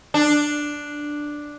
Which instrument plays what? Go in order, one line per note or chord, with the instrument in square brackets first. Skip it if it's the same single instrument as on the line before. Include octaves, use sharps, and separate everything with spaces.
[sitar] D4